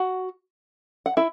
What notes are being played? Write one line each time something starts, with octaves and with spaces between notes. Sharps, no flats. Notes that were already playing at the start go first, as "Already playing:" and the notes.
Already playing: F#4 F#5
F#5
E4 E5